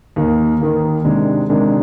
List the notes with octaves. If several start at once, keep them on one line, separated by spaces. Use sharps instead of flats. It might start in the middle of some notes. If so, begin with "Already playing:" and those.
D#2 D#3 A#3
D#2 D#3 A#3
C3 D#3 G#3 D4
C3 D#3 G#3 D4